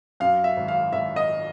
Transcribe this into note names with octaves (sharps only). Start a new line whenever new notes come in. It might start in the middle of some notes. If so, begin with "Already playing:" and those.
F#2 F5
E5
G#1
F5
G#1 E5
D#5